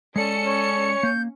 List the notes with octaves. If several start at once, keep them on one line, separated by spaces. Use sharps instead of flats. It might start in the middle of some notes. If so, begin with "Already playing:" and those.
G#3 C#4 A4 D5 C#7
C#5
A#3 G6